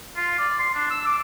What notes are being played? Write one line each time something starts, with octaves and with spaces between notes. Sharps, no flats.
F4
D5
C6
D4
E6
D6